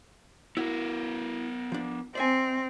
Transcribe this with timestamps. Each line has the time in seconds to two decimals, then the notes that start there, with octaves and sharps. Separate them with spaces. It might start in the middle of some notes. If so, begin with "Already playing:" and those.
0.57 B3 E4 F#4 A#4
1.72 F3 D4
2.15 C4 D5 E5 G#5